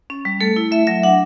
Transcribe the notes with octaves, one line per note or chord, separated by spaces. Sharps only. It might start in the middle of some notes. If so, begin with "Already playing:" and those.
C#4
G3
A3 A4
E4
A3 E5
F#3 E5
D4 F#5